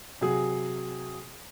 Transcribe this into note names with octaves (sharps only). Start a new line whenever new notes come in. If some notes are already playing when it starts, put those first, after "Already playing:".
C3 F#3 F#4 G#4